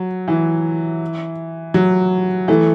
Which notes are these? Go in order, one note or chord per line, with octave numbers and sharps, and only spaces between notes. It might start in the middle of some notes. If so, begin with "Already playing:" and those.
Already playing: F#3
E3
F#3
E3 A3